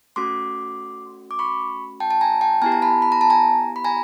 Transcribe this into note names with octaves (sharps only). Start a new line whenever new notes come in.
A3 C#4 F#4 C6 D6
D6
B5 C#6
G5 A5
A5
G#5 A#5
G5 A5
B3 E4 G4 G#5 A#5
A#5
A5 B5
B5
A#5
A5
G#5 A#5
B5
G#5 A#5